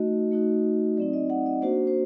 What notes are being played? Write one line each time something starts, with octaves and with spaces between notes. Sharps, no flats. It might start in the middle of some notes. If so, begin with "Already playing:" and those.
Already playing: A3 D#4 F#4 D#5
A3 D#4 F#4
F#3 C4 D#4 D5
D#5
F#5
D#5
A#3 D4 F#4 C5
C5